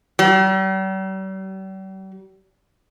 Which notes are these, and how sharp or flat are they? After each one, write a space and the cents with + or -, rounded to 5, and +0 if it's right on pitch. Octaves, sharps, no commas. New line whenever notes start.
G3 -45